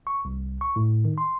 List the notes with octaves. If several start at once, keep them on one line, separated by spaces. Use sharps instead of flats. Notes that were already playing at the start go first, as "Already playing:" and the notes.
C#6
C2
C#6
A2
D#3
C6